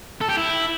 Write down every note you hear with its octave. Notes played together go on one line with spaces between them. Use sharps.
A4
G4
E4